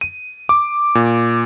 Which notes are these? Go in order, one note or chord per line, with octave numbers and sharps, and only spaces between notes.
D#7
D6
A#2